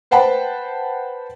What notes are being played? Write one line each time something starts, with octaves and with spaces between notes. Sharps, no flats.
B4 C5 F#5 G5 A5 B5